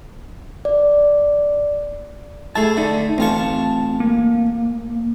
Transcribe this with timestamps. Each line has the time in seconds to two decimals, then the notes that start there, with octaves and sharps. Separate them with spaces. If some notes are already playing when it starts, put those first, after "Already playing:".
0.65 D5
2.55 A3 E4 G#4 A5
2.77 D3 D#4 D5 E5
3.18 A1 C4 F4 A5 C#6
4.00 A#3